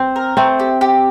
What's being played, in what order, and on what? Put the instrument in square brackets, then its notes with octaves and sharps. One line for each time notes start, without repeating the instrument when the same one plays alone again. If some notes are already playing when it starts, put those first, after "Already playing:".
Already playing: [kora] C4
[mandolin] A#4
[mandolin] A3 [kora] C4
[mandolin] G4
G4